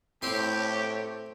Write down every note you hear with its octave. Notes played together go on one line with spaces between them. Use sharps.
A2 A3 C4 G4 C#5 C6